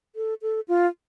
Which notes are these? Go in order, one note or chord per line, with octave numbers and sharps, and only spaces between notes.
A4
A4
F4